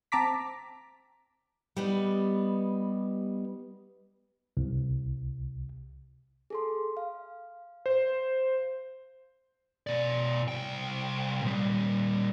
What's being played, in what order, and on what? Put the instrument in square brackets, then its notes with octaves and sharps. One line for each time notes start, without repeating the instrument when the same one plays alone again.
[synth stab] C4 A5 A#5 D6 B6
[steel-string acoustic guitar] G3 B3 D#4
[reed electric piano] C2
[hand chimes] G#4 A4 C6
F5
[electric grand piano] C5
[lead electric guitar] B2 D5
C2 G5
A#2 G3